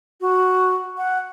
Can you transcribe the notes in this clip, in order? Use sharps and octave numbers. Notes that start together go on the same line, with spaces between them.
F#4
F#5